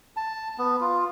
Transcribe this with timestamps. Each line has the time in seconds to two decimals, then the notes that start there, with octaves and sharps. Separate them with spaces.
0.17 A5
0.58 B3
0.81 F4